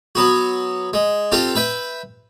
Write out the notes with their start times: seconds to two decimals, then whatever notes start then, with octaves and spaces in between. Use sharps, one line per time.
0.15 F#3 B3 F#4
0.93 G#3
1.32 C4 F4 G4 A4
1.55 B4 E5 G5